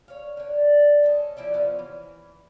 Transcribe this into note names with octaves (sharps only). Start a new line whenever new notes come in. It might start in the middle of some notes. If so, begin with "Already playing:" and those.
C#5 F5
D3 C#5
C#4 A4 C5 D#5
F3 E4 D5 E5
F3 B3 C#4 F5
E3